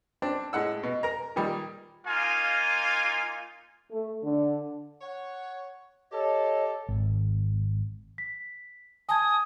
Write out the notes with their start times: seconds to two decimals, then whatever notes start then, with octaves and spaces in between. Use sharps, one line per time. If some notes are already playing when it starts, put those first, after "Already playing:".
0.22 C4 D4
0.53 A2 G#3 F#5 E6
0.83 B2
1.03 A#4 A#5
1.36 A#2 D#3 G3
2.06 A#3 D#4 F4 F5 G#5
3.91 A3
4.22 D3
5.01 C#5 F#5
6.12 G4 A4 C#5 D#5
6.89 G#1
8.18 B6
9.09 G#5 A5 D#6 G#6